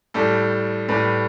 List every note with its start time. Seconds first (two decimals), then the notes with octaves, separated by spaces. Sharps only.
0.14 A2 G3 A4
0.89 A2 G3 B4